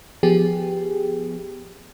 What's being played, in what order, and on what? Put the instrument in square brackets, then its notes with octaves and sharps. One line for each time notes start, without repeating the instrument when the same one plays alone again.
[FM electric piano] F3 B3 G4 G#4